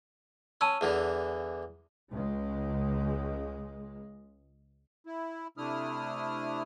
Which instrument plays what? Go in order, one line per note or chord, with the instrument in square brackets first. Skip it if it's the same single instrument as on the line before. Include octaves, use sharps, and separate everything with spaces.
[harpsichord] C#4 [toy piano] A5 E6
[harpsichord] E2 D3 E3
[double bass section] C#2 G#3
[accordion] E4
C3 A3 D4 E4 D#6 F6